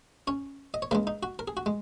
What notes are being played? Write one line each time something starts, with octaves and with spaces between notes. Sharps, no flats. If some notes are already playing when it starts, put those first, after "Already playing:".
C#4 C#5
D#5
C#5
C#2 C#3 G#3 A#3 A#4
D#4
F#4
A#4
G#4
F#4
G#3